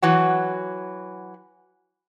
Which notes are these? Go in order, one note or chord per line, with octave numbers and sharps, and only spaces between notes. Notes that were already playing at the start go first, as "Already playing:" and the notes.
E3 F#3 F#4